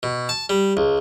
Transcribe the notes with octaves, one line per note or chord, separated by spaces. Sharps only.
B2
A5
G3
C#2